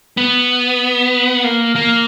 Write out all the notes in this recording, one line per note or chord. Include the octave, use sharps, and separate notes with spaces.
B3
A#3
A#3